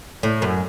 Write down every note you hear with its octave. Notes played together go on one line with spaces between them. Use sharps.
A2
F#2